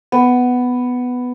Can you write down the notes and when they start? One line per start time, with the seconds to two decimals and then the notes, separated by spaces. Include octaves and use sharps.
0.12 B3